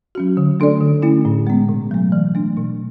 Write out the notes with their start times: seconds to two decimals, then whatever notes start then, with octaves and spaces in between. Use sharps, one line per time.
0.15 F#3 C#4 F#4
0.37 D3
0.60 A3 D4 A4 D5
0.81 D3
1.02 A3 C#4 E4
1.25 A2
1.47 G#3 B3
1.69 B2
1.91 F#3 A3
2.12 E3
2.35 A3 D4
2.57 B2